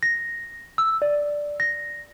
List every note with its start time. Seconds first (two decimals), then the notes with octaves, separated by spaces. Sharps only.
0.03 A#6
0.78 E6
1.02 D5
1.60 A#6